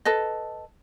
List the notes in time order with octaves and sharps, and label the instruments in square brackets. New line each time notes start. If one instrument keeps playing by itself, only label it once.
[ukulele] A4 B4 D#5